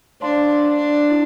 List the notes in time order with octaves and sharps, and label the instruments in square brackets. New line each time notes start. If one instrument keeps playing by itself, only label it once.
[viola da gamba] D4 [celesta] C5 F5 A5 C6
[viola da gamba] D4
[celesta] E4